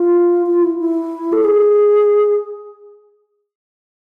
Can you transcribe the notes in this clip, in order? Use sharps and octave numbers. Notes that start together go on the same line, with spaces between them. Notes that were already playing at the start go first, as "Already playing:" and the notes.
Already playing: F4
F4
E4
E4
A4
G#4